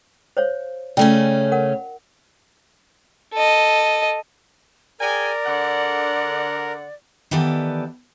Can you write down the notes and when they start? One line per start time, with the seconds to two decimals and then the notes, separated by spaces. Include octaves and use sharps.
0.37 C5 C#5 F5
0.97 C#3 A3 C#4 F4 D5 G5
1.52 A#4 F#5
3.33 A4 D#5
5.00 G#4 A#4 D5 G5 G#5
5.46 D3 F#5
7.31 D#3 E3 B3 G4 A4 D5